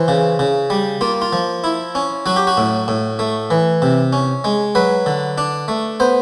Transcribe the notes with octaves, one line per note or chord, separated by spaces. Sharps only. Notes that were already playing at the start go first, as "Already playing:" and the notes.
Already playing: E3 C5
C#3
C#3
G3
A#3 F4
F4
F3
E4
C#4
F#3 F#4
G4
F#4
A2
A2
A3
E3
C3
C#4
G#3
F#3 B4
D3
D4
A3
B3 C5